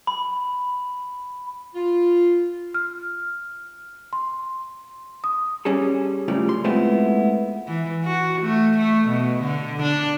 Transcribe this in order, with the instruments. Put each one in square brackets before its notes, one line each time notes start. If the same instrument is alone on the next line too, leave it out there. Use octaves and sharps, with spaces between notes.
[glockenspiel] B5
[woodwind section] F4
[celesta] F6
C6
D#6
[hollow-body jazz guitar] G3 C#4 G#4 A4
F#2 A2 C#3 F3 G3
C6
G#3 A3 B3 C4 E4 F4
[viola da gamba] E3
F#4
A3
A3
B2
D3
D4